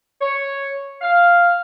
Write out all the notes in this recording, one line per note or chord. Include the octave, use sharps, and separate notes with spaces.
C#5
F5